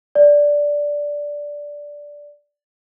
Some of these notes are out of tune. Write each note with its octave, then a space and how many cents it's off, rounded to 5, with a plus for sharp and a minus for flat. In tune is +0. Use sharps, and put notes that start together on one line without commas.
D5 -5